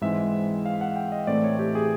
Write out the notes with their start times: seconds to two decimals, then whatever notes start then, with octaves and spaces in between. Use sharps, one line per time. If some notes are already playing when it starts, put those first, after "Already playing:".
0.01 G#2 E3 G#3 C4 E5
0.66 F5
0.81 F#5
0.96 G5
1.12 D#5
1.27 A2 E3 A3 C4 D5
1.44 C#5
1.59 G4
1.75 G#4